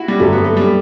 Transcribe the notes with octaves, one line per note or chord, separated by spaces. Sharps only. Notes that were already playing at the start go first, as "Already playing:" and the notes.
Already playing: E4 F#4
G3
G1 F#2 F#3 A3
B3
A3
G3